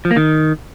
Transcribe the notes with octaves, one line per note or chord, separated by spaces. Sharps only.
F3
A#3
D#3